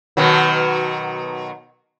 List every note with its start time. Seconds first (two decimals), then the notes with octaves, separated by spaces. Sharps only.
0.17 B2 D#3 F#3